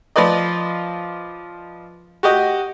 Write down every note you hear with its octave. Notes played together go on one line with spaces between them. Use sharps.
F3 F4 B4 D5 D#5
F#4 G4 D#5